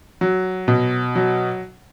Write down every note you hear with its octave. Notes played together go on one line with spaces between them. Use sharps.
F#3
B2
F#3